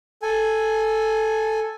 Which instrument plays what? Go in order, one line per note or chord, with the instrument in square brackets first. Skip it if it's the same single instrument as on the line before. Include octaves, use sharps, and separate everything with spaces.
[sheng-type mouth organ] A4 G#5